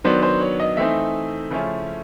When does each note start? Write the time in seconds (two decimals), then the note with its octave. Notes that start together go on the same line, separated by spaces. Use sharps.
0.04 D#3 F#3 B3 D4 C5
0.23 C5
0.41 C#5
0.60 D#5
0.77 E3 A3 C4 D#4 E5
1.50 C#3 F3 A3 C#4 E4